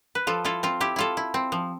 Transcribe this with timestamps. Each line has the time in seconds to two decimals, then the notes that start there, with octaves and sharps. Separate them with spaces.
0.15 B4
0.27 F3 F4 A4
0.45 E4 F4 A4
0.63 C4 F4
0.81 E4 G4
0.96 E4 F4 A4
1.17 E4
1.34 C4
1.52 F3